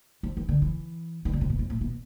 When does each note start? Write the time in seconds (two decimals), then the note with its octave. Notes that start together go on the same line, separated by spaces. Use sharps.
0.23 F3
0.37 E3
0.49 D3
0.62 E3
1.25 E3
1.33 D3
1.41 C3
1.50 B2
1.59 F2
1.70 A2
1.81 B2